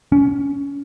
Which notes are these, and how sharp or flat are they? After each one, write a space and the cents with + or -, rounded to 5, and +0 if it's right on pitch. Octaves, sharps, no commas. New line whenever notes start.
C#4 +20